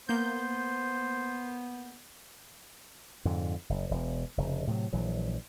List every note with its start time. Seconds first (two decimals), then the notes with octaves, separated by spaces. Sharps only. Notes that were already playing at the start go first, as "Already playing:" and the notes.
0.09 A#3 B3 C5 G6
3.25 F2 G#2 D3
3.69 F#1
3.91 E1
4.37 F1 C#3
4.67 A2 C3 F3 F#3
4.93 A#1 E3 F#3